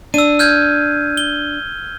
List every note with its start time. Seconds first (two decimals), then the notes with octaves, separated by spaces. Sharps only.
0.14 D4 E6 D#7
0.39 F6 G6 G#6
1.17 G7